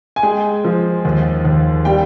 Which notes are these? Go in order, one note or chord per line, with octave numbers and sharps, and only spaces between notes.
G#5
G#3 G5
F3
D#2
D#2
G3 G5